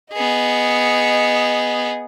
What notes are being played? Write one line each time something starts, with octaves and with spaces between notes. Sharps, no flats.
B3 G#4 D#5